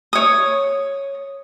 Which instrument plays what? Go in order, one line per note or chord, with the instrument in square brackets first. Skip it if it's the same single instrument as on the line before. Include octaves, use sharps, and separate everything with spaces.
[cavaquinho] C#5 D#6